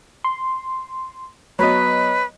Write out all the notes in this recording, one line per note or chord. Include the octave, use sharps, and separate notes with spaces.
C6
F#3 B3 B4 C#5 D#5